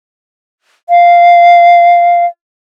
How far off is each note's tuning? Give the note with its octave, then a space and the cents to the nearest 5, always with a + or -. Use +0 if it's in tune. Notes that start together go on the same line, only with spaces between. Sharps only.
F5 -5